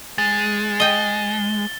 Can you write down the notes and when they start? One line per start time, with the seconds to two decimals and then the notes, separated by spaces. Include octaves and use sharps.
0.18 G#3 A6
0.80 D#5 G5 G7